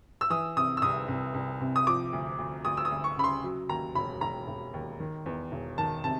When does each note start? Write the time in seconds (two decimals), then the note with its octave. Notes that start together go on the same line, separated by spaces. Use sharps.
0.21 E6
0.30 E3 D#6
0.57 C3 D#6
0.77 E6
0.82 C2 D#6
1.08 C2
1.34 C2
1.61 C3
1.76 D#6
1.87 F3 D6
2.13 D2
2.39 D2
2.65 D2 D#6
2.77 E6
2.85 D#6
2.91 D2
3.04 C#6
3.17 C#3 B5
3.24 C6
3.43 F#3
3.69 D#2 A#5
3.95 E1 B5
4.21 E1 A#5
4.48 E1
4.74 D#2
5.00 D#3
5.26 E2
5.52 E1
5.78 D#3 A5
6.04 C3 A5